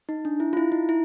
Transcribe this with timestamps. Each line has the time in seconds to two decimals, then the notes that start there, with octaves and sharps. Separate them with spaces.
0.09 D#4
0.25 D4
0.40 E4
0.53 F4
0.57 E4
0.72 D#4
0.89 E4